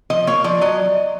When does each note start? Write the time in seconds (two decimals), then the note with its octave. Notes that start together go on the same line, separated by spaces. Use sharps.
0.10 F3 D#5
0.27 A#3 C#5
0.44 F3 D5
0.61 F#3 D#5